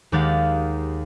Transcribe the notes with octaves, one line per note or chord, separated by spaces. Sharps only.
D#2 G#3 G4 F5 F#5 A6